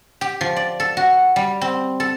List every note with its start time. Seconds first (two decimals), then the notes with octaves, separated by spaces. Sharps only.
0.21 G4
0.41 F3
0.56 D5
0.80 A4
0.97 F#4
1.36 G3
1.61 C4
2.00 A4